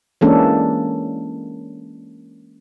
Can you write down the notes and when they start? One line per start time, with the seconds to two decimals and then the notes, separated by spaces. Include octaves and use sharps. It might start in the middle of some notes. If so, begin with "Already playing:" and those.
0.21 E3 G#3 A#3 C#4 D4 A4